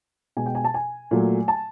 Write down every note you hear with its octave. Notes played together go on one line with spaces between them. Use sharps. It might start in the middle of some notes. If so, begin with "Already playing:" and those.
B2 G#3 G#5
G5
G#5
A5
G#5
A#2 F#3 A3
A5